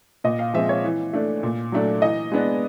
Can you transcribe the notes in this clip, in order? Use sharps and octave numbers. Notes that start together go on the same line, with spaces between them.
A#2 D#5
F5
F3 G#3 C4 E5
C#5
E3
A3 D4
A#2
F#3 A3 D4
E3 D#5
G#3 B3 D4